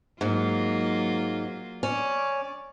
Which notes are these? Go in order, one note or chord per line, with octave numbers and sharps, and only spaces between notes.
G#2 F#3 A#3 F4
C#4 D5